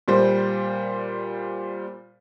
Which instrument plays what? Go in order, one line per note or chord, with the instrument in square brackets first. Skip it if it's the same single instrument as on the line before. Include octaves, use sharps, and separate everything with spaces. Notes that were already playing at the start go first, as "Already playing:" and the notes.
[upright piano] A#2 G3 C5